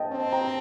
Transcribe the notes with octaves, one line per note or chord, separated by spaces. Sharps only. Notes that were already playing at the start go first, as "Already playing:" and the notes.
Already playing: D#5 G5 A5
C4
G5 A#5